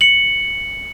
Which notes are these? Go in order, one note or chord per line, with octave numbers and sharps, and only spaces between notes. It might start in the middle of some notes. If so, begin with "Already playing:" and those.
C#7 F#7